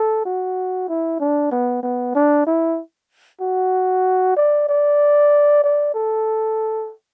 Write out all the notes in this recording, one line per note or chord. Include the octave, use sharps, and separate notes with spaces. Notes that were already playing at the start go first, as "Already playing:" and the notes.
Already playing: A4
F#4
E4
D4
B3
B3
D4
E4
F#4
D5
D5
D5
A4